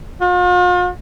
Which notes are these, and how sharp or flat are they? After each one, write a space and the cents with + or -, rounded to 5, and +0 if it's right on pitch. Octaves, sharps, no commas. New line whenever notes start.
F4 +45